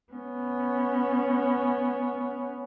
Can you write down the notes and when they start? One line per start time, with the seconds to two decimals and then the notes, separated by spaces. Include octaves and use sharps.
0.13 B3 C#4